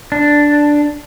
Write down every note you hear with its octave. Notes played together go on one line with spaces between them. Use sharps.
D4